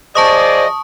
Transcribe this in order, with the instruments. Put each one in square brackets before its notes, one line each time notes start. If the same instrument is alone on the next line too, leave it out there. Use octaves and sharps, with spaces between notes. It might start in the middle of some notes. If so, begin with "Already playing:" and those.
[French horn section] F3 G#4 D5 [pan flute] C5 [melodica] D#5 [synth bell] A5 C#6 D#6